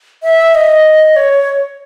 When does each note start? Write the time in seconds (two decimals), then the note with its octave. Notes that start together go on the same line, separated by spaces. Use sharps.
0.23 E5
0.55 D#5
1.16 C#5